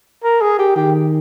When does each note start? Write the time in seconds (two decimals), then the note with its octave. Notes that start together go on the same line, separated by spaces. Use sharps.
0.24 A#4
0.41 G#4
0.58 G4
0.76 D#3 G4